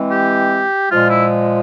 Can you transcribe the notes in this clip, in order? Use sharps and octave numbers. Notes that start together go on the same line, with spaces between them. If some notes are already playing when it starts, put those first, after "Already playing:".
Already playing: E3 G#3 C4
G4
A#2 F3 G#3 F4
E4